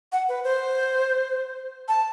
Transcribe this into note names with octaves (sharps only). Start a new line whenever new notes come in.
F#5
B4
C5
A5